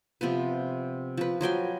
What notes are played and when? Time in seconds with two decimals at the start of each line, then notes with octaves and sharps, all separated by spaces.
0.21 C3 F3 B3 B4
1.17 F3 B4
1.41 F3 F#3 G5 G#5